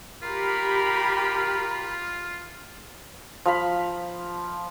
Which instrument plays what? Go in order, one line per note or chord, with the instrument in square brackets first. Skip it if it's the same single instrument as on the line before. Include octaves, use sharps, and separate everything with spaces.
[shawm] F4 [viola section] G4 B5 [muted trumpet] A#4
[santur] F3 F5 B5